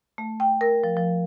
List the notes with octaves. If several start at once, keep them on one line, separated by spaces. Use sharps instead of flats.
A3
G5
A#4
F3
F3